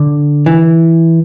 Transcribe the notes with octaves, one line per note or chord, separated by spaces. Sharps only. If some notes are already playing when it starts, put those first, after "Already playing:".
Already playing: D3
E3